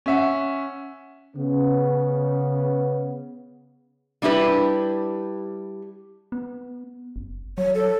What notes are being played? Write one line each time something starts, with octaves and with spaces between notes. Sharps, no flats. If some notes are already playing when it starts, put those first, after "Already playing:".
C#4 E5 F#5
C#3 B3
G3 D4 E4 G4 B4
B3
F#1
F#3 C#5
A4